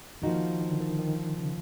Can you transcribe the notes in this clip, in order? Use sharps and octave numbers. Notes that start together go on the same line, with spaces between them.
D#3 F3 A#3 D#4 F#4
D#3
D3
D#3
D#3
C#3